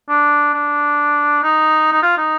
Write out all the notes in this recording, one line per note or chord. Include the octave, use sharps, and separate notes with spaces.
D4
D4
D#4
D#4
F4
D#4